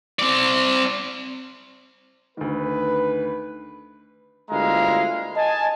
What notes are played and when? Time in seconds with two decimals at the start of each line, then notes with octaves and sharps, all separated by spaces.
0.19 C4 D5
2.37 D2 D#3 B4
4.51 G1 D2 G#3 E4 F5 A#5
5.37 D#5 G#5 A5